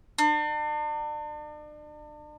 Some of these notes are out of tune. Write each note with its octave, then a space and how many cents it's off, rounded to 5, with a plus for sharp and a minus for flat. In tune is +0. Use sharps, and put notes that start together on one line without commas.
D4 +40